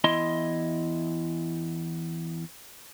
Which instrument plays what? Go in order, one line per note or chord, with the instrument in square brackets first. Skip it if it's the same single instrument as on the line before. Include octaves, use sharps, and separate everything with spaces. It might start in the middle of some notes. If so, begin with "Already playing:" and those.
[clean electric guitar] E2 E4 D#5 C6